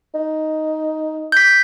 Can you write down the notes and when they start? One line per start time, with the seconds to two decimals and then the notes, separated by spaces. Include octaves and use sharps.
0.14 D#4
1.32 G6 B6